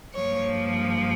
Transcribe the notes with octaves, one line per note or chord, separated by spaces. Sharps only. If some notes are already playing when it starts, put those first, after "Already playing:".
G2 F3 A#3 C#5